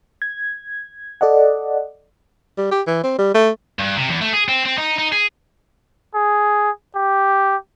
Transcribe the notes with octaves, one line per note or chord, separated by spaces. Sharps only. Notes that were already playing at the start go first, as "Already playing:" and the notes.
G#6
A4 D5 D#5 F#5
G3
G4
E3
C4
G3
A3
G2
C3
E2
A3
G#4
C4
C4
D#4
D#4
G#4
G#4
G4